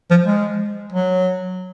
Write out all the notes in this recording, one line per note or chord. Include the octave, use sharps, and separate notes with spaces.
F3
G#3
F#3